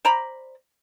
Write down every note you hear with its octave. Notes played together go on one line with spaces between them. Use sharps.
C5 D5 A#5 B5